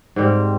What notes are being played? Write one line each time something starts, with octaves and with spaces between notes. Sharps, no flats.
G#2 G3 C4